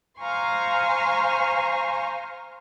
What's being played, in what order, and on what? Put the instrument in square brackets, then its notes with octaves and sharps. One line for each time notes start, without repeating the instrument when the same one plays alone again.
[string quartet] C5 F5 G#5 A#5 C6 C#6